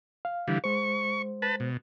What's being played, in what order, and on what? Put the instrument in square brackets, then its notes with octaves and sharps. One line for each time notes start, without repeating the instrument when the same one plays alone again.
[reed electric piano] F5
[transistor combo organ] D3 E3 G3
[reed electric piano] G#3 C5 [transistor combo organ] C#6
[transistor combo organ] B4 A5
B2